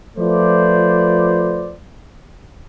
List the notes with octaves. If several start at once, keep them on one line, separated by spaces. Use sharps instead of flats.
F3 A3 F4 B4 C5 D5